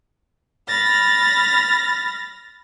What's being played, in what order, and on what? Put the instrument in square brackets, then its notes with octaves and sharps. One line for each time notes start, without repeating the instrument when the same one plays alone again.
[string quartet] B5 F6 A6 A#6